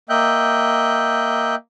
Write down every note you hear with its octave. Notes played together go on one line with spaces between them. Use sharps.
A#3 D#5 E5 G5 F#6 G6